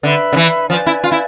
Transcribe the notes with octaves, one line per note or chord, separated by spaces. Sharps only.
D3 B4 E5 B5
D3
E3
F3 B4 D5 G#5
E4
F4
E4